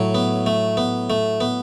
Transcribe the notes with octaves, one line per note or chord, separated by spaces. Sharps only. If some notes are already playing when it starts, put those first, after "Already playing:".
Already playing: A2 F#3
B3
A3
B3
A3
B3